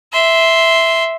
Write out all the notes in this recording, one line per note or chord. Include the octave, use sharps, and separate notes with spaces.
E5 C6